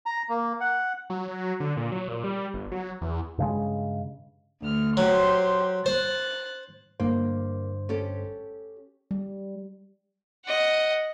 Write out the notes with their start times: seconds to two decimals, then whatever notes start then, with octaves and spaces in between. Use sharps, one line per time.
0.06 A#5
0.29 A#3
0.61 F#5
1.10 F#3
1.28 F#3
1.60 D3
1.77 A#2
1.92 F#3
2.08 A#2
2.24 G3
2.54 G1
2.72 F#3
3.01 E2
3.38 G2 C#3 G#3
4.61 D2 F6
4.97 F#3 G4 C5 C6
5.86 C5 F#6 A6
7.00 G1 G2 A#3 C5
7.89 C#4 G4 A4
9.11 G3
10.46 D#5 F#5